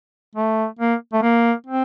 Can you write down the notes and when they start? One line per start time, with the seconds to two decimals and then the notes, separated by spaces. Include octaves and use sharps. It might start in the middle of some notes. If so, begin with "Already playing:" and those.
0.35 A3
0.79 A#3
1.13 A3
1.22 A#3
1.67 C4